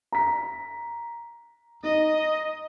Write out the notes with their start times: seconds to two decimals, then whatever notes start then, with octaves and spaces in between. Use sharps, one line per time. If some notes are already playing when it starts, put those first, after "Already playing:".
0.12 A#5 B6
1.83 D#4 D#5